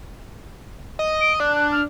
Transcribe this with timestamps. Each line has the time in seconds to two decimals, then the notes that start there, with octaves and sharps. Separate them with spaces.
0.99 D#5
1.21 D7
1.40 D4 F#6
1.56 F#6
1.72 F6